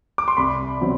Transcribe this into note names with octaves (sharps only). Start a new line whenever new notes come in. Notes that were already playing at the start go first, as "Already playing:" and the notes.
D6
C6
C2 B5
B2 F#3 C4